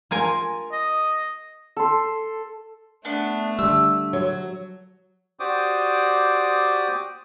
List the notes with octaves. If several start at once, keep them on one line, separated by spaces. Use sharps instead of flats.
F4 A#4 G#5
D#5
A4 C6
A3 B3 D4
D3 G3 E6
F#3
F#4 G4 C5 D5 D6 D#6